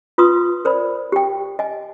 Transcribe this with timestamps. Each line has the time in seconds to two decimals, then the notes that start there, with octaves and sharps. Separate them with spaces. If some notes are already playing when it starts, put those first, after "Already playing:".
0.18 F4 B4 C6 D#6
0.65 A#4 C5 D5 B5
1.12 G4 G5
1.59 D#5 G#5